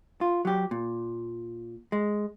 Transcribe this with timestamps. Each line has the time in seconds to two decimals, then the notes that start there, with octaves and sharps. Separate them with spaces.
0.21 F4
0.45 F#3 G4
0.71 A#2
1.92 G#3